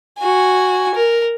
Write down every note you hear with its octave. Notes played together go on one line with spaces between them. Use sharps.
F#4 G#5
A#4